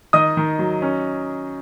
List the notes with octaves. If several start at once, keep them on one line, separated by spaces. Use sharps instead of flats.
D#3 D#5 D#6
D#3
F#3
C#4